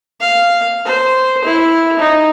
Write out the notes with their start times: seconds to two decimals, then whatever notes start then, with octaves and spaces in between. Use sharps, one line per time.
0.21 F5
0.85 C5
1.45 E4
1.99 D#4